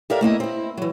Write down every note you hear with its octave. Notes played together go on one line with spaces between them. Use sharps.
G4 A4 A#4 D5 E5 F5
A3 A#3 E4 D#5
C4 E4
E3 F#3